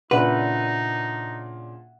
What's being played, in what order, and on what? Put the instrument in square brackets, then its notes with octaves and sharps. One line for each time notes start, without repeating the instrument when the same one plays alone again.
[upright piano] A#2 C#3 D4 [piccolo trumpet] D#4 [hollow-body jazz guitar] B4 [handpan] E5 F#5